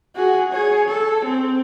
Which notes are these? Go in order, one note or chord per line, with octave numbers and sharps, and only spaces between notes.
F#4 G#4
G#4 C#5
A4
C4